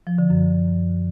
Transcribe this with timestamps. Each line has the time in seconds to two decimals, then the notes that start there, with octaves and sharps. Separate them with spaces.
0.07 F3
0.18 D3
0.30 F#2